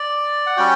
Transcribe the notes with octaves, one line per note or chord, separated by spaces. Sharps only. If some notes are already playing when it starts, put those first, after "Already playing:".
Already playing: D5
F#5
G3 C#4 F#4 G5